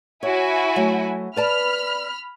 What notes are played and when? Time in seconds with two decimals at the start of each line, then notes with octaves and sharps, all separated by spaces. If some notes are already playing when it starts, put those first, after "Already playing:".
0.23 E4 F#4 C#5 G#5
0.76 F#3 A3
1.36 B4 D5 A5 B5 F6